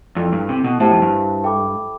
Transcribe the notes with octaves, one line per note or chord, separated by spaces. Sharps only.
F2 E4 A4 D5
G2
C3
B2
A2 E4 G4 C5 E5 A5
F2
G2
A4 E5 G5 B5 D6